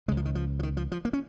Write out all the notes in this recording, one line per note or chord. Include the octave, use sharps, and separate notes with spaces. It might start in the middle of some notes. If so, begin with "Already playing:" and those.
C#2 C#3 G#3
F3
D#3
F3
F3
D#3
F3
F3
A#3
C#4